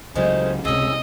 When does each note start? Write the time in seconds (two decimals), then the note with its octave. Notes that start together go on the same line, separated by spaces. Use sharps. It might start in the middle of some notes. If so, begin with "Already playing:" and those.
0.15 C#2 C#3 F#3 G#3 A3 C#4 C5
0.65 C#2 C3 C#4 G#4 D#5 E6